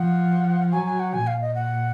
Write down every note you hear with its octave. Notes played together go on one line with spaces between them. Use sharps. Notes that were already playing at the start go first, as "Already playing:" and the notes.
Already playing: F3 F#5
F#3 G#5
G#5
F#5
A#2 G#5
F5
D#5
F#5